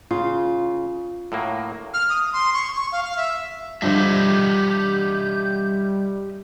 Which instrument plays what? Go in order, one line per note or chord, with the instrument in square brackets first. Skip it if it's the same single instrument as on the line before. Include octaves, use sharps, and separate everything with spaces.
[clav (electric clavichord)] C#3 [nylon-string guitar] F4
[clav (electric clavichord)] A2 F#3 A#3
[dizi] F6
D#6
C6
C#6
C#6
F5
F5
E5
[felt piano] G2 D3 F3 [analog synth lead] G3 [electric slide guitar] G4 D#5 E5 [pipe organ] G6